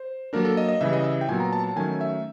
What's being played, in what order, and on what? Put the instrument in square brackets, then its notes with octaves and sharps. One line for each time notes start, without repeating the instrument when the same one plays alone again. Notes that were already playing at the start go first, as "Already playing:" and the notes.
Already playing: [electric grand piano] C5
F#3 A#3 D4 A#4
A4
D#5
D#5
C#3 E3 G3 E5
D#5
E5
G5
A#2 F#3 B3 G#5
A#5
A5
A5
D#3 F#3 A3 C#4 G#5
E5